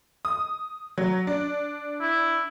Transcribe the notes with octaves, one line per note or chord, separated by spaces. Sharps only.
D#6
F#3
D4
E4